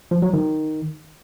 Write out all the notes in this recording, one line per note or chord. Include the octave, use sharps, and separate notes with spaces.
F3
F#3
D#3